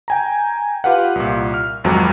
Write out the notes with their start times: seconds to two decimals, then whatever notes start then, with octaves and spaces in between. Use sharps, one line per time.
0.08 G5 G#5 A#5
0.84 F4 G4 B4 F5 F#5
1.15 C2 A#2
1.54 F6
1.84 G#1 F2 G#2 F#3 F#4 A#5